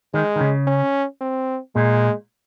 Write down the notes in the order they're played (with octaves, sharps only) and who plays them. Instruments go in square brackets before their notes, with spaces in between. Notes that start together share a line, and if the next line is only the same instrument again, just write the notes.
[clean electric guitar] D#3 [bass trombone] G#3
[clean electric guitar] D#3
C#3
[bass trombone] C#4
C4
[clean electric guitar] A#2 [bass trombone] G#3